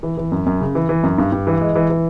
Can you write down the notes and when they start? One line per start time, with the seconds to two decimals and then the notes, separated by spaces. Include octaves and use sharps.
0.03 E3
0.17 E3
0.32 F#2
0.46 F#2
0.61 C#3
0.75 E3
0.89 E3
1.03 F#2
1.18 G2
1.32 G2
1.47 E3
1.61 G#3
1.75 E3
1.90 E3